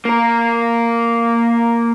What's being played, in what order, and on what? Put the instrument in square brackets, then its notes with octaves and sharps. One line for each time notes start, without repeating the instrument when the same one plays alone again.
[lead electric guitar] A#3 A#4